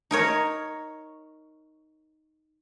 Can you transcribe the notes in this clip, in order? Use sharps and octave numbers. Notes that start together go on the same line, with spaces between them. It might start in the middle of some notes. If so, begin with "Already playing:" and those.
D#4 A#4 C#5